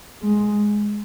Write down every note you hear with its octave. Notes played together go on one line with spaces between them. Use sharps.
G#3